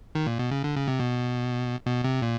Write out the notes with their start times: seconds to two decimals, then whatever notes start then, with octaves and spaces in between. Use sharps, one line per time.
0.15 D#3
0.27 A#2
0.39 B2
0.51 C#3
0.64 D3
0.76 C#3
0.88 C3
1.00 B2
1.86 B2
2.04 C3
2.22 A#2